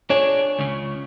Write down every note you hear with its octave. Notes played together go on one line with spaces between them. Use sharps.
D4 G#4 C#5
C#2 C#3